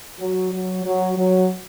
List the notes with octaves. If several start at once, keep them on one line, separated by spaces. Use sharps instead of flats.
F#3
F#3
F#3
F#3